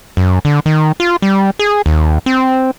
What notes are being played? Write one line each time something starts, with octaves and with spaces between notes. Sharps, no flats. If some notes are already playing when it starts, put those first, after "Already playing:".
F#2
D3
D#3
F4
G3
G#4
D#2
C4